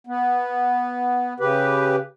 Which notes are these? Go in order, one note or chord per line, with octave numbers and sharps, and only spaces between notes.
B3
C#3 G4 B4